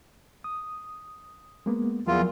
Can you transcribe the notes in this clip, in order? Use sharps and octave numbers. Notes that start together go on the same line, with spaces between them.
D#6
G#3 A#3 B3
E2 F3 F#3 F4 A#4